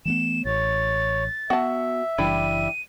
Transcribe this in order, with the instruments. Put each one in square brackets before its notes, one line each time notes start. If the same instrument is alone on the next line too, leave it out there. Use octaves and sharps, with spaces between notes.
[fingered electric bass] E3 A3 B3 [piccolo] E7
[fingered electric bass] A1 [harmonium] C#5 [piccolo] A6
[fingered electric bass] B3 [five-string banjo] F#4 A5 [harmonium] E5
[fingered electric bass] F#1 E3 [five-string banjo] G3 D4 E4 [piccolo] D#7